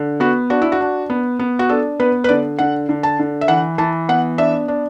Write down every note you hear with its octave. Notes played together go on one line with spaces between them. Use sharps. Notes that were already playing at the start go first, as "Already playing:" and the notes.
Already playing: D3
B3 F#4
D4 F#4
E4
F#4
D4
B3
B3
F#4
D4 A4
B3 B4
B4
D3 D5
D3 F#5
D3
A5
D3
E5
E3 F#5
E3 A5
B3 F#5
D4 E5
D4